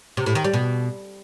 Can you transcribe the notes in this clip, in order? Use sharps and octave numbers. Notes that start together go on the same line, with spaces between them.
C3
A2
D#3
G3
B2